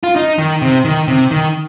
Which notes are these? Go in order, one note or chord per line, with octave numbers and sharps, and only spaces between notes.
F4
D#4
D#3
C3
D#3
C3
D#3